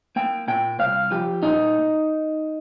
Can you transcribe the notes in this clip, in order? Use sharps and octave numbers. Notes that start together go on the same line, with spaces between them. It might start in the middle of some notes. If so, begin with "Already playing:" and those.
A#3 G5
A#2 G5
C2 F5
F3 G4
A#2 D#4